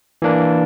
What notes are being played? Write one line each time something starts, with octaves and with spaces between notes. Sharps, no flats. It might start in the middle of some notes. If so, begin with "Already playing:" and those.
E3 A#3 D4